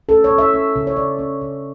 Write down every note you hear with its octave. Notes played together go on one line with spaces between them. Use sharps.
C#4 A4
C#5
C#4
E5
C#4
C#3
C#5
C#3 D5
C#4
C#3